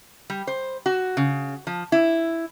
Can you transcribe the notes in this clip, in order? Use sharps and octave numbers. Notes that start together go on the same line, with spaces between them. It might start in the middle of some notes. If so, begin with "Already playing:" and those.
G3
C5
F#4
C#3
F3
E4